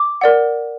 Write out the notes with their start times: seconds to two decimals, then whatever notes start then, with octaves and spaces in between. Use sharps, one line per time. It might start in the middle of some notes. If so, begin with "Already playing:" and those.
Already playing: D6
0.21 A#4 D5 F#5